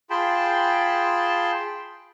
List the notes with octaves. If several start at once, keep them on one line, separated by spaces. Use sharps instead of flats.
F4 G#4 G5 A5 B5 C6